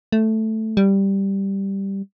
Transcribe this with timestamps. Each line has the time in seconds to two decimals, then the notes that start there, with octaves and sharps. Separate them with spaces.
0.12 A3
0.77 G3